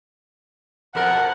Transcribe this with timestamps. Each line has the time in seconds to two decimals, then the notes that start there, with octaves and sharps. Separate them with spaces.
0.95 F2 B2 A#4 F#5